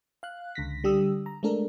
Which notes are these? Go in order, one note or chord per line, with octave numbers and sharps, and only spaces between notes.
F5 F#6
C#2 D3 A#6 B6
D3 G3 G4 D#6 E6
A#5
G#3 A3 D4 A4 A#4